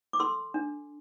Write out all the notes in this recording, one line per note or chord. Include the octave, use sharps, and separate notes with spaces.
D6
A4 C6 E6
D4